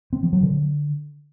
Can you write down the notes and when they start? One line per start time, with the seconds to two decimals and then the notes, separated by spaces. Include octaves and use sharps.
0.13 C4
0.23 F3
0.33 F#3
0.43 D3